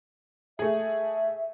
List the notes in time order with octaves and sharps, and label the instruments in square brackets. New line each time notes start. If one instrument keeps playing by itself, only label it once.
[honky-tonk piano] A3 G#4 [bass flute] E5